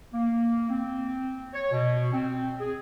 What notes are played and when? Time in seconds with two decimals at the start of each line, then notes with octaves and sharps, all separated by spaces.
0.13 A#3
0.70 C4
1.54 C#5
1.72 B2
2.13 C4
2.60 G#4